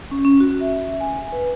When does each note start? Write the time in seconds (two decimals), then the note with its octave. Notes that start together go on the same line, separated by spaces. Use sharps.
0.11 C#4
0.25 C#4
0.40 F#4
0.61 E5
1.00 G#5
1.32 B4